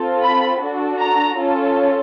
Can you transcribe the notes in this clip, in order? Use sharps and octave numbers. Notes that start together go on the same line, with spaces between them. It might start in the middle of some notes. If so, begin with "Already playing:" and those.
Already playing: C4 F4 A4
B5
D4 F#4 A4
A#5
C#4 F4 A4